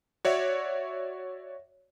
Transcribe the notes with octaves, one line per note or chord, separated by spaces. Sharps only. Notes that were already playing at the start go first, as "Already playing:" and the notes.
F#4 C#5 D5 E5